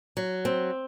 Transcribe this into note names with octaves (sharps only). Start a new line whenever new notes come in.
F#3
C4